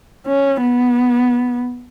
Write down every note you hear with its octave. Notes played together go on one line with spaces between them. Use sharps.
C#4
B3